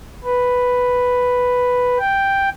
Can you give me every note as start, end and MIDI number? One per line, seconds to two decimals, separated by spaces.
0.24 1.98 71
1.99 2.49 79